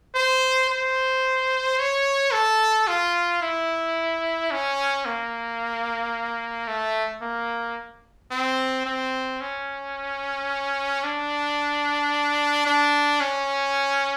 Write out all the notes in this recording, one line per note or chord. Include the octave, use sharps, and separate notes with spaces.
C5
C5
C#5
A4
F4
E4
C#4
A#3
A3
A#3
C4
C4
C#4
D4
D4
C#4